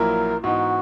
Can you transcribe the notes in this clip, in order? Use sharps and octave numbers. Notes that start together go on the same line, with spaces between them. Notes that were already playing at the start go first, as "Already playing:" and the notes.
Already playing: A#1 A#2 F#3 A#3 E4 A#4
G#2 E3 B3 D#4 F#4